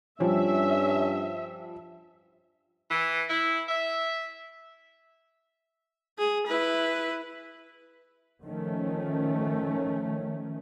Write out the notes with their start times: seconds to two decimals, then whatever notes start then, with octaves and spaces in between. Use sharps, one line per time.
0.20 G2 F3 G3 C#4 E5
2.91 E3
3.29 E4
3.69 E5
6.18 G#4
6.47 E4 B4
8.44 D#3 F3 A3 C#4